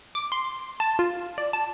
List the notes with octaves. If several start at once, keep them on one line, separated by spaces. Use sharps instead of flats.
D6
C6
A5
F4
D5
A5